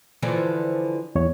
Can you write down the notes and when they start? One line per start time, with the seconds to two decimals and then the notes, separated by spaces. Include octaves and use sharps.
0.22 D3 E3 F3
1.15 E2 C#5